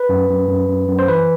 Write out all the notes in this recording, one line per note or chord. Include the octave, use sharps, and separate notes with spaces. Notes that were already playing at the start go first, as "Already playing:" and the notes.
Already playing: B4
F#2
F#2
F#2
F#2
F#2
C5
E3 B4